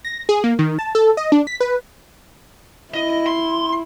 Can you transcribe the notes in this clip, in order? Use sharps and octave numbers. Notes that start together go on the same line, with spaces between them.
A#6
G#4
A#3
D#3
A5
A4
D#5
D4
B6
B4
E4 D#5
C6